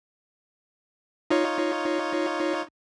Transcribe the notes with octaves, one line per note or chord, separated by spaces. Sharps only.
D#4 F4 C#5